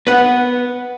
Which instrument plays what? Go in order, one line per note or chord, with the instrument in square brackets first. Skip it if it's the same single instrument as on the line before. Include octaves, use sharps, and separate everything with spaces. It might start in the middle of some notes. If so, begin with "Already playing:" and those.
[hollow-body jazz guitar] B3 B4 F#5